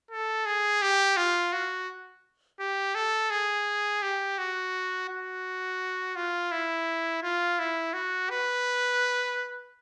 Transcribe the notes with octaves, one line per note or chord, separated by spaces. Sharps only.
A4
G#4
G4
F4
F#4
G4
A4
G#4
G4
F#4
F#4
F4
E4
F4
E4
F#4
B4